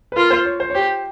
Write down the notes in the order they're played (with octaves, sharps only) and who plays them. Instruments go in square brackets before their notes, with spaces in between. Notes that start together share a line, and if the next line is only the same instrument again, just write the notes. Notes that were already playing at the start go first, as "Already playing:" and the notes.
[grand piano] B4
[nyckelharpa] F4 [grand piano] A#4
[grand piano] C5
C#5
C5
C#5
[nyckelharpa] G4 [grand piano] C5